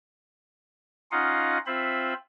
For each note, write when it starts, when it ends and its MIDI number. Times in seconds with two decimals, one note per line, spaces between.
1.11 1.58 61
1.11 1.58 63
1.11 1.58 65
1.11 1.58 75
1.11 1.58 77
1.11 1.58 78
1.66 2.13 60
1.66 2.13 65
1.66 2.13 72
1.66 2.13 76
1.66 2.13 83